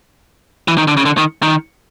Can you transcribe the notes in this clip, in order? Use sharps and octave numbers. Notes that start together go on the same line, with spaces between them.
E3
D#3
D3
C#3
D3
D#3
D#3